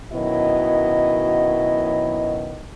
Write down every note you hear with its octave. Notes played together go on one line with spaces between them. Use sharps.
F#2 B2 D#3 F#3 E4 D#5